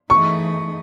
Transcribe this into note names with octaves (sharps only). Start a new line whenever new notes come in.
E3 A3 D#4 G#4 D#5 C#6